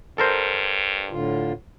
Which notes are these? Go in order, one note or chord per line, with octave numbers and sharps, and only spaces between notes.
G2 A4 A#4 C5
A2 D3 F4